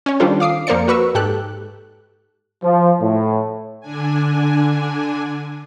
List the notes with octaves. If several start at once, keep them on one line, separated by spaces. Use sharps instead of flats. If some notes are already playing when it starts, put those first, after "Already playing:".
C#4 C#5
D#3 G3 D4 F4 A4 C5
F5 D6 D#6 C7
F2 A#3 A#4 C5 D5 C#7
F#4 A#4 B4 C#6 E6
G#2 G4 A4 F#6
F3
A2
D3 D4 G#5